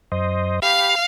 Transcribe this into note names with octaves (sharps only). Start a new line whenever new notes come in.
F#2 C5 D#5
G4 F5 B5